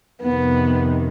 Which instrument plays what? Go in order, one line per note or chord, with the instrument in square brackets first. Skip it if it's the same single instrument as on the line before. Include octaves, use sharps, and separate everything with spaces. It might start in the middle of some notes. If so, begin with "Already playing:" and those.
[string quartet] F2 C3 D#3 B3